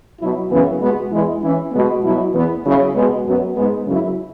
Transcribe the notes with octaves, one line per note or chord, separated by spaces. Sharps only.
B2 F#3 E4
F#2 C#3 E3 B3
B2 G#3 B3 F#4
E2 E3 G#3 E4
E3 C#4 E4
B2 G#3 B3
B2 F#3 E4
E2 E3 B3
C#3 F#3 E4
B2 G#3 B3
F#2 F#3 B3 F#4
G#2 G#3 B3
F#2 C#3 F#3 E4